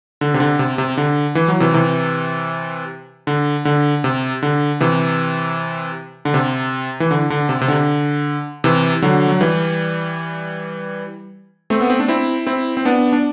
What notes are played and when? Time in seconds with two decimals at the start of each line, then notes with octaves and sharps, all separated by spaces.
0.21 D3
0.34 C3
0.40 D3
0.59 C3
0.78 C3
0.97 D3
1.35 E3
1.48 F#3
1.60 C3 E3
1.74 C3 E3
3.27 D3
3.65 D3
4.04 C3
4.43 D3
4.80 C3 E3
6.25 D3
6.34 C3
7.00 E3
7.11 D3
7.30 D3
7.49 C3
7.61 C3
7.68 D3
8.64 C3 E3
9.02 D3 F#3
9.28 F#3
9.41 E3 G3
11.70 A3 C4
11.81 B3
11.90 C4
12.00 D4
12.08 C4 E4
12.47 C4 E4
12.77 C4
12.85 B3 D4
13.13 D4